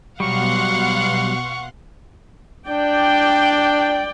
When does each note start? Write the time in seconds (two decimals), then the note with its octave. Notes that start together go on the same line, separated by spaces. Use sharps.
0.20 B2 F#3 G3 F5 F#5 C6 C#6 F#6
2.68 D4 D5 G5